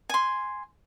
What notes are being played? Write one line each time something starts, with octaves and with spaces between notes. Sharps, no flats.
G#5 C6